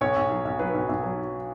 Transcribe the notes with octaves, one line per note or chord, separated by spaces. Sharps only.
B1 C#5
B1
F#3
B1
F#3 B4
B1
B1
F#3